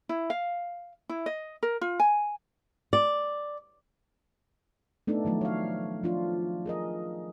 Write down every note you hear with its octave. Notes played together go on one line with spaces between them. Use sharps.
E4
F5
E4
D#5
A#4
F4
G#5
D5
A3 B3 D4 D#4 A4
D#3 F3 F#3 A3
C#5 F5
F3 D4 F4
G#4 A#4 D#5